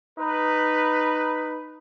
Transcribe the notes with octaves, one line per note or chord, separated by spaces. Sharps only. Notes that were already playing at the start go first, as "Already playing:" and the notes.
D#4 B4